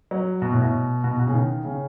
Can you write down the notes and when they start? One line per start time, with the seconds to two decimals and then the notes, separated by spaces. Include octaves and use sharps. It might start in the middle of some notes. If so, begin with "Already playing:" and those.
0.11 F#3
0.42 B2
0.52 A2
0.62 B2
1.04 B2
1.19 B2
1.27 C#3
1.34 D#3
1.64 C#3